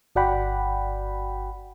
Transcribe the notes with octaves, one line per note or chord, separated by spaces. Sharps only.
G1 F#4 D5 F#5 G5 B5